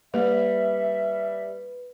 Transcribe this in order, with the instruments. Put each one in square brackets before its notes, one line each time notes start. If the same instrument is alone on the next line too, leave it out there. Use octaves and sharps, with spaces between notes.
[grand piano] G3 [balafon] A#3 [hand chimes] B4 [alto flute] E5